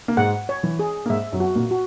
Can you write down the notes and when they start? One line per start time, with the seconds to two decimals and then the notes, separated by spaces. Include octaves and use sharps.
0.08 A#3
0.17 G#2 G#3 F#5
0.49 C#5
0.63 E3
0.79 G#4
1.06 A#3
1.09 G#2 G#3 E5
1.32 F#2 F#3
1.40 F#4
1.56 A#2 A#3
1.71 F#4